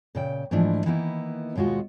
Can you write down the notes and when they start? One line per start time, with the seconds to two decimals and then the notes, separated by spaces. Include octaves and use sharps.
0.15 A#2 C#3 G5
0.51 G#2 E3 F3 A3 D4 E4
0.85 D#3 E3 A#3 B3 D#4 E4
1.55 D#2 B2 G#3 F4 F#4